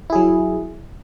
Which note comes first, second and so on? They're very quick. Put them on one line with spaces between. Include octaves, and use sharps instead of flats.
E4 G#4 F#3